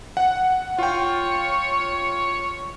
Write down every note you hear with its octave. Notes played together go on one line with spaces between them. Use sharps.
F#5
F4 C#5 G5